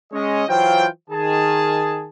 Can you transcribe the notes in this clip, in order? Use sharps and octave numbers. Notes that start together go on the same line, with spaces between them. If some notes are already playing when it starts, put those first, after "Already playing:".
G#3 C#4 C#5 D#5
E3 F#3 F4 C5 F5 G5
D#3 G#4 A5